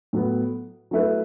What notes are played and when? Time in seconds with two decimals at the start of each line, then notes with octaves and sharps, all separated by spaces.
0.13 A2 F#3 B3
0.91 F#3 A3 E4 B4